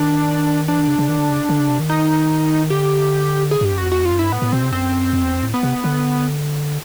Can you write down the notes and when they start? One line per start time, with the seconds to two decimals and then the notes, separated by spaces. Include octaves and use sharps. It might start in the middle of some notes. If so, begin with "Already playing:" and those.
Already playing: D#3 D4
0.68 E3 D4
0.79 D#3
0.88 C#3
0.99 C#3
1.09 D#3
1.18 D3
1.30 C#3
1.49 D3
1.59 C#3
1.69 C3
1.80 D#3
1.89 D#4
2.70 D3 G4
3.51 G#4
3.61 G2 G4
3.72 F#2
3.78 F2 F#4
3.92 E2 F#4
4.02 F2 F4
4.12 F#2
4.19 G2 E4
4.32 A2 B3
4.42 A2
4.52 B2 C4
4.63 C3
4.72 F#2 C4
5.13 F2
5.23 E2
5.34 F2
5.43 A2
5.54 B3
5.63 C3
5.84 D3